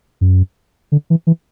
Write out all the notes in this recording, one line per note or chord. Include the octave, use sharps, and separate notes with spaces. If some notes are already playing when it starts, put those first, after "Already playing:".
F#2
D3
E3
E3